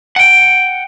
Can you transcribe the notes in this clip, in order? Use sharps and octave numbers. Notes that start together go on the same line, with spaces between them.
F#5 G5